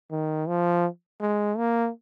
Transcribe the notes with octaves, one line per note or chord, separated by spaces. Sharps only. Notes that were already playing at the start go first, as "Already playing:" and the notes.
D#3
F3
G#3
A#3